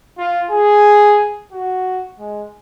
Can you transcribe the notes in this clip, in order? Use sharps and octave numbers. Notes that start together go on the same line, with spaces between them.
F4
G#4
F#4
G#3